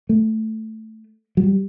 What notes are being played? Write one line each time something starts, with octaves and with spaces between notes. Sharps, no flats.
A3
F#3
G3